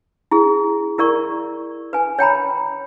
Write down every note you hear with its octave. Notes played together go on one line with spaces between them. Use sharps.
E4 G#4
E4 A#4 D5 C#6
B4 G#5
C#5 G5 A#5 B5